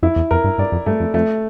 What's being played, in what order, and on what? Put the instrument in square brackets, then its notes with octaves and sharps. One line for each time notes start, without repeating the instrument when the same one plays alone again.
[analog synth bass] F2 [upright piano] E4
[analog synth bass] E2
[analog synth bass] F2 [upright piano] A#4
[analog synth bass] G2
[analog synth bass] G2 [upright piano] D5
[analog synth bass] F2
[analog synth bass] G2 [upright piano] A3
[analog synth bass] F2
[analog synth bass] F2 [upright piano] A3